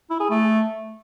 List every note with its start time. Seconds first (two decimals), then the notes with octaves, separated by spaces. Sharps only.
0.10 E4
0.20 G#4
0.30 A3